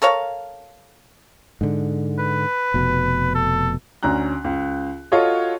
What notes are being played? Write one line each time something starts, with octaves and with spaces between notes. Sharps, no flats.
A4 A#4 C#5 F5
G#2 D3
B4
F1 B2
A4
D2 C#4 A#5 F#6
C#2
F4 F#4 A4 C#5 D#5